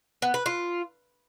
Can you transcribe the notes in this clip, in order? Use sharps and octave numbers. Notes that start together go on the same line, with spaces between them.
B3
B4
F4